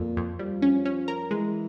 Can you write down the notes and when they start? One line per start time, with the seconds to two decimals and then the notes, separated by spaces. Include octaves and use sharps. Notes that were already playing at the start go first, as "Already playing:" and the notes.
Already playing: F2 A#2
0.17 F2
0.39 F3 G3
0.62 C#4
0.85 C#4
1.08 A#4
1.30 E3 G#3